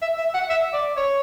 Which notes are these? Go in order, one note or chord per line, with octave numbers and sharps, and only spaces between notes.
E5
E5
F#5
E5
D5
C#5